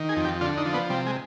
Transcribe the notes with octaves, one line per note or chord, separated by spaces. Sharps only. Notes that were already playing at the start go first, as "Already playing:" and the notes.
Already playing: D#3
G#4
F2
G4
D3 F4
D#4
F3
B3
C3 G3
G#3